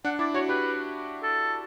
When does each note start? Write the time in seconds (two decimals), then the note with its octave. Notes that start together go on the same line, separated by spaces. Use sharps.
0.05 D4 F#5
0.19 E4 D5
0.34 F#4 C#5
0.49 G4 B4
1.23 A4